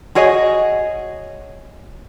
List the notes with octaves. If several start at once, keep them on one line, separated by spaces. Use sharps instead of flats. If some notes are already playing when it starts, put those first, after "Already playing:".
F#4 G#4 C#5 D#5